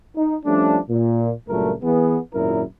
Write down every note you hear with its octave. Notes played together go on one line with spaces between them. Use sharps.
D#4
F3 G3 A3 C#4 D4
A#2
C#2 G2 A#2 F#3 A3 A#4
E3 B3 G#4
G#1 F#2 A#2 E4 A#4